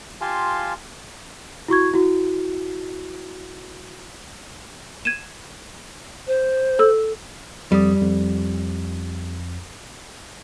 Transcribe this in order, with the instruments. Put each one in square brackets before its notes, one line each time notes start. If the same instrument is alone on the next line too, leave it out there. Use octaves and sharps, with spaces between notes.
[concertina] F4 G4 F5 G#5 A5 C6
[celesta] E4 F#4 C#6 G#6
E4 F#4
[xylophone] G#6 D#7 E7
[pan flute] C5
[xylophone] A4 E6
[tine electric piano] F2 D5 D#6 [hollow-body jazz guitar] G3
[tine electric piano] F2